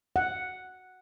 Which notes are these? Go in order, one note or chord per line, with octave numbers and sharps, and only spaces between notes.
F#5